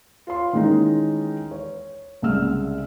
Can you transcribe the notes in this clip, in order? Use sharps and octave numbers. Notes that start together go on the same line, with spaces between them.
F4 C#5 C6
D#3 E3 G#3 C#4 D#4
C#5
C2 C#3 G#3 F#5 E6 F6